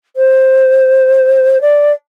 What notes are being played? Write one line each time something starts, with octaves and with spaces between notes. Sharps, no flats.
C5
D5